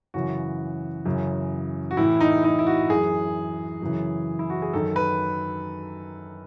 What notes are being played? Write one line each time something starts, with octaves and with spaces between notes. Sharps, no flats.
F#2 C#3 E3 F#4
F#2 C#3 E3
F#4
A2 E3 E4
D#4
D#4
E4
F#4
F#2 E3 G#4
F#2 C#3 E3
E4
F#4
G#4
F#2 D#3 A4
B4